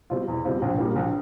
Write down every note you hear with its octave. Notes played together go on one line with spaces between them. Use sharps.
B2 G3 C4 F4
E2
B2 G3 C4 F4
A#1
A#2 G3 A#3
A#1